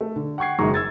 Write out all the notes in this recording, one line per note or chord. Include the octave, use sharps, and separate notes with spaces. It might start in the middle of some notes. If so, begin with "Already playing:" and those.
A3
D3
F#5 G5 C#6 G#6 C7
F#1 F#2 D#3 G#3 A#5 C#6
E6 G#6 A6